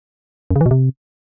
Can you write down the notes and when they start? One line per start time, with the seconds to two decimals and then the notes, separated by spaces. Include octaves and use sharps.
0.51 F#2
0.56 C#3
0.61 E3
0.66 B2
0.71 C3